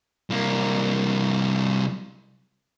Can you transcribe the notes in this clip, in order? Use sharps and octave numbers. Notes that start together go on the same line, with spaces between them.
C2 A#3